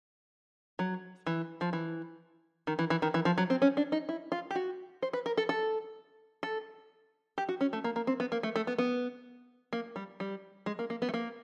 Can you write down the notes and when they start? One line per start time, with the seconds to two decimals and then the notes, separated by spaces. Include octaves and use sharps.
0.79 F#3
1.27 E3
1.61 F3
1.73 E3
2.67 D#3
2.79 E3
2.90 E3
3.02 D#3
3.14 E3
3.25 F3
3.38 F#3
3.50 C4
3.62 C#4
3.77 D4
3.92 D#4
4.09 E4
4.32 F4
4.51 G4
4.55 F#4
5.02 C5
5.13 B4
5.26 A#4
5.37 A4
5.49 A4
6.43 A4
7.38 G4
7.49 F#4
7.61 C#4
7.73 A3
7.84 A#3
7.96 A#3
8.07 C4
8.20 B3
8.32 A#3
8.43 A3
8.56 A3
8.67 B3
8.78 B3
9.73 A#3
9.96 G3
10.20 G3
10.66 G#3
10.79 A#3
10.90 A#3
11.02 B3
11.09 A3
11.14 A#3